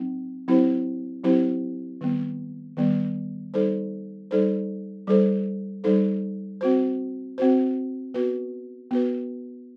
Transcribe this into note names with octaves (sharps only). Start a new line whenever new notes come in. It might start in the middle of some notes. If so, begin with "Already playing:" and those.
Already playing: F#3 C4 D#4
F#3 C4 E4 G4 C5
F#3 C4 E4 G4 C5
D#3 G3 B3
D#3 G3 B3
G3 D#4 A4 C5
G3 D#4 A4 C5
G3 D#4 A4 C5
G3 D#4 A4 C5
C4 F#4 C5
C4 F#4 C5
B3 F#4 B4
B3 F#4 B4